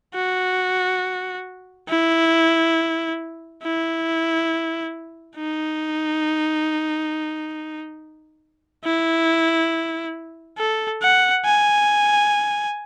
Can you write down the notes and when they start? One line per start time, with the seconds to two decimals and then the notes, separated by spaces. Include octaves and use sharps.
0.15 F#4
1.89 E4
3.63 E4
5.37 D#4
8.84 E4
10.58 A4
11.02 F#5
11.45 G#5